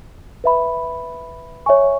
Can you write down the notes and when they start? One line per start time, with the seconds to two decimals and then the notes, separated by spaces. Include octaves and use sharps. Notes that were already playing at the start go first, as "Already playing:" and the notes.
0.44 B4 E5 B5
1.66 C#5 E5 G#5 C#6